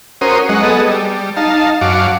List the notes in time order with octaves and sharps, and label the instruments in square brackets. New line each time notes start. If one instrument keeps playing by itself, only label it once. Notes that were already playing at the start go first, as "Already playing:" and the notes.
[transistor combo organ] C#4 F#4 A#4 C5 D#6
F#3 G#3 D#5 F#5
B3 G#4 A4 D#5
G3
D#4 F5 A5
F#2 F#4 F5 D6